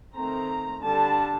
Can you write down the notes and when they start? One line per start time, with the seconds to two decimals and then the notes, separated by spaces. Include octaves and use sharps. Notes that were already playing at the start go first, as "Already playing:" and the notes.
0.15 D#3 A3 C4 A#5
0.83 D3 G3 D4 A5